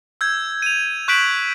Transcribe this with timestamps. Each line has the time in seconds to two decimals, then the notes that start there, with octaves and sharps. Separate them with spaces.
0.21 E6 G6 G#6
0.62 D#7 F7
1.08 C#6 F#6 G6 B6 D7 F#7